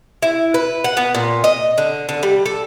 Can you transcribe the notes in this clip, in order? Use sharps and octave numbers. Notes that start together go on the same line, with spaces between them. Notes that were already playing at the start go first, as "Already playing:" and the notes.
E4
B4
F#5
B3
A#2
D#5
D3
D3
G3
A4